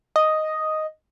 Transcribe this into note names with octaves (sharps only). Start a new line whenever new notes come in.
D#5